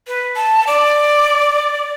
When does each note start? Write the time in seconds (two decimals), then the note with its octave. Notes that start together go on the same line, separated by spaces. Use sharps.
0.07 B4
0.36 A5
0.67 D5